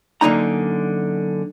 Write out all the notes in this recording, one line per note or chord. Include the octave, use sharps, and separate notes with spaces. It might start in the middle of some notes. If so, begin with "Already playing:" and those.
F#2 D3 A#3 D#4 A#5